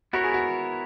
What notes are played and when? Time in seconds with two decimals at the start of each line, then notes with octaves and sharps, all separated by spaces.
0.13 B3 E4 F#4 A#4 C#5
0.24 G#4
0.34 F#4